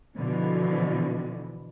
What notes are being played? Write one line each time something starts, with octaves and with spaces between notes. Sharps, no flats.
B2 D3 E3 F3